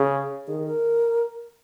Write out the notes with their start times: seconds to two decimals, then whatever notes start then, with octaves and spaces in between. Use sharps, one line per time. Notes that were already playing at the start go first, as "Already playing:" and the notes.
Already playing: C#3 G#4
0.48 D#3 G#4
0.64 A#4